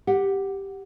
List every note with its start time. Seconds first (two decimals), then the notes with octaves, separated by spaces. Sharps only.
0.07 G4 F#5